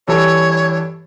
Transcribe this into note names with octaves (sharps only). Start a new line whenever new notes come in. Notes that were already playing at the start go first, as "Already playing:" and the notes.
G2 E3 A4 C#5